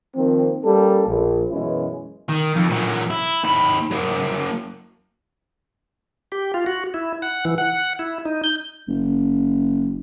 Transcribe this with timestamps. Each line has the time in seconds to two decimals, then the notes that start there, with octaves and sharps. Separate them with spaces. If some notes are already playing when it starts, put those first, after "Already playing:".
0.16 D#3 F3 A#3 C4
0.64 G3 A#3 C#4 A4
1.07 A#1
1.51 F#2 B2 E3 G#3 C#4 E4
2.29 D#3
2.56 F2
2.69 A#2 F#3
3.10 E4
3.44 D#2 B5
3.91 F#3 A#3
6.32 G4
6.54 F4
6.66 F#4
6.94 E4
7.22 F#5
7.45 E3
7.58 F#5
7.99 E4
8.25 D#4
8.44 G6
8.88 F#1